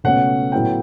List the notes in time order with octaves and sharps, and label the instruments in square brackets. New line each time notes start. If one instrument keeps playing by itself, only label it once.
[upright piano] C#2 B2 A3 C#4 F#5
A2 F#3 B3 E4 G5